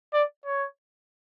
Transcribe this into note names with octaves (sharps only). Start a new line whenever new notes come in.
D5
C#5